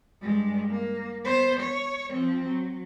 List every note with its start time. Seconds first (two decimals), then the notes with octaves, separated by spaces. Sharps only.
0.22 G2 G#3
0.70 A#3
1.24 B3 C5
1.60 C#5
2.10 F3 C4
2.47 F#3